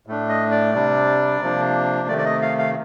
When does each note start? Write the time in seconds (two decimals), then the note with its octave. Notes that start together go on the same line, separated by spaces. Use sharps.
0.07 A2 A3 D4
0.29 D#5
0.51 D5
0.74 C3 G3 D4
1.41 C3 F3 A#3 D4
2.08 C3 D#3 A3 D5
2.18 D5
2.25 D#5
2.42 F5
2.59 F5